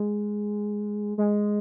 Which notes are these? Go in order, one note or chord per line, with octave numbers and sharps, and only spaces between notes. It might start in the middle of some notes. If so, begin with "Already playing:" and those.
Already playing: G#3
G#3